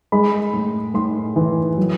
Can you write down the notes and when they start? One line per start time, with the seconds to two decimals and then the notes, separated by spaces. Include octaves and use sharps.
0.12 G#3 B5
0.53 A2
0.94 A2 C6
1.36 E3
1.77 F#3